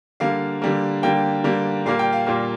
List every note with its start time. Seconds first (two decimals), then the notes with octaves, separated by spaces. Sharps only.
0.20 D3 G3 A#3 F5
0.62 D3 G3 A#3
1.03 D3 G3 A#3 G5
1.44 D3 G3 A#3
1.86 A#2 G3 A#3 F5
1.99 G5
2.12 F5
2.27 A#2 G3 A#3